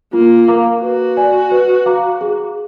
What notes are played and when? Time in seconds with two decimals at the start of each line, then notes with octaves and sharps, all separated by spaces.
0.13 A#3 F4
0.48 A#4 F5 A#5 D6
0.83 F#4 B4
1.17 D5 G#5
1.51 B4
1.86 F5 A#5 D6
2.21 G#4